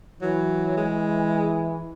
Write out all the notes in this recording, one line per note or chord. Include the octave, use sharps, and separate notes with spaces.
E3 F#3
G#3